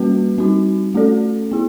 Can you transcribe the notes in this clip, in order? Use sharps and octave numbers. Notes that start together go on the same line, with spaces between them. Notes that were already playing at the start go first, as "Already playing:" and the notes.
Already playing: G3 A#3 C#4 F#4 B4
G3 C4 D#4 F#4
A3 C#4 F#4 A4 D5
B3 E4 G#4